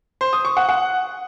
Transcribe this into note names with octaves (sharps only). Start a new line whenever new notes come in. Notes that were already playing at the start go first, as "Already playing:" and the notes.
C5
D#6
C#6
F#5
F#5